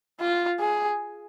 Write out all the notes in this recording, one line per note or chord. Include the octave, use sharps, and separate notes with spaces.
F4
G#4